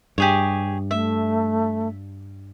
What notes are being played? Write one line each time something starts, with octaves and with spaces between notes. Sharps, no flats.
G2 G4 G#4 C#5
A3 E5